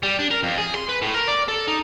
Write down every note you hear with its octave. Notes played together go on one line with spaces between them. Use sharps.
G3
D4
A#4
F2
G#4
C6
B4
A2
A#4
D5
A4
D#4